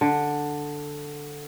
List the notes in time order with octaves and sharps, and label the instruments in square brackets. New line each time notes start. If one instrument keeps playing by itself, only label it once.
[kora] D3